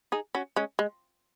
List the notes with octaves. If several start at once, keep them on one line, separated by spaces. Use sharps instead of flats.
D#4 G#4
C#4 F#4
G#3 C#4
G#3